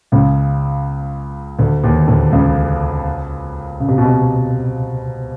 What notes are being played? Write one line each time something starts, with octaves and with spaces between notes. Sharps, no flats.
C#2 C#3
D2 D3
D#2 D#3
D2 D3
C#2 C#3
C#3
C3
B2
C3